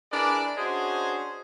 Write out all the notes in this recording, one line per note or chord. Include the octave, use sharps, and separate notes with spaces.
D4 E4 G#4 A#4 B4 D5
C#4 D4 F#4 G#4 C5 D#5